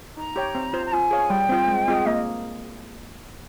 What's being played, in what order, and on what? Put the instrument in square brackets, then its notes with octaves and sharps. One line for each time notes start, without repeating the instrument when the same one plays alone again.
[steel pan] D#4 [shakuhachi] A#5
[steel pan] G4 C#5 G5
C4
F4 C5
[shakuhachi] A#5
[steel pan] F4 [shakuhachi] G#5
[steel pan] G#4 C#5 F5
[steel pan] G3 [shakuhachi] G5
[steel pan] C4 F4 C5
G#3
C4 F4 G#4 D#5
[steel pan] A#3 [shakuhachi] D#5